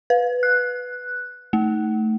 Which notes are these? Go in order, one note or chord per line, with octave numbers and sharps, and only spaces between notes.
B4
F#6
A3